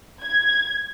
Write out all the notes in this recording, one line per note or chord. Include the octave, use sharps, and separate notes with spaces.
G#6